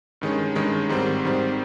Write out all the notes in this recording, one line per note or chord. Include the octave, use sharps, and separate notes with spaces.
G2 D#3 G#3 C#4
G2 D#3 G#3 C#4
G#2 D#3 G3 C4
G#2 D#3 G3 C4